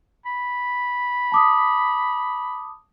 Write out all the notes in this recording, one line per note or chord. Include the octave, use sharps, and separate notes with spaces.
B5
A5 D6 D#6